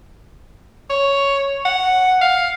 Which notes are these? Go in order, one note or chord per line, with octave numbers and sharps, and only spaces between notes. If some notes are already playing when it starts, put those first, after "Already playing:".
C#5
F#5
F5